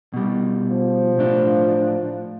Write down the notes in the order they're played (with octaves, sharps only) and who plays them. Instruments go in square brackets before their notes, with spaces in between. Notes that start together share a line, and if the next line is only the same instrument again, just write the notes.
[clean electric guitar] B2 G3
[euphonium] F3
[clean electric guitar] A2 D4